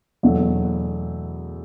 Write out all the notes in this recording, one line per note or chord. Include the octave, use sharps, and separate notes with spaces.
E2 B2 F#3 A3